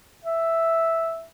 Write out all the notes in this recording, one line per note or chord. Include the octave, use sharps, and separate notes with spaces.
E5